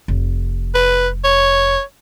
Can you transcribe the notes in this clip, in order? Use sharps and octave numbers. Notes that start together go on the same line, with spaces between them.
F1
B4
C#5